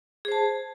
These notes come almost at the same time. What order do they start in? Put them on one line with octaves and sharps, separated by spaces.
G#4 C5 A5